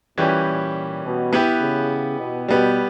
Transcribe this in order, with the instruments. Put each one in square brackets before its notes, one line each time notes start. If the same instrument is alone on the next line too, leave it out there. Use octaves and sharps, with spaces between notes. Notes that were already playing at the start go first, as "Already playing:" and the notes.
[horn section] A#2 [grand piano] E3 G3 C#4 G4 B4
[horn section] A#2
B2
[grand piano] B3 E4 G4 B4
[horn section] C#3
B2
[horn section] B2 [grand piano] G3 B3 G4